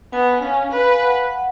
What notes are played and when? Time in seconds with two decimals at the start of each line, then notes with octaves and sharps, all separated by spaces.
0.13 B3 G#5
0.42 C#4 F5
0.72 B4 F5
1.01 F#5
1.31 F#5